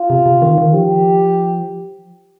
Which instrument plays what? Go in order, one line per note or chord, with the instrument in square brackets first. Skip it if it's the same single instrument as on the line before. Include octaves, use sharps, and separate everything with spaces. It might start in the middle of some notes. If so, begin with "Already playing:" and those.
Already playing: [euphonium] F4
[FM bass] C3
C3
D#3
D#3
[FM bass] F3 [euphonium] G4